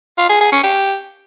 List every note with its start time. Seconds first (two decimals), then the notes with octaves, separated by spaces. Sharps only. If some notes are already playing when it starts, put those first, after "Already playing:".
0.18 F4
0.29 G#4
0.41 G#4
0.52 C#4
0.64 G4